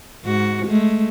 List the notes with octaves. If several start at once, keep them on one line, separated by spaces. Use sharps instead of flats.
G#2 F#4
G#3 A3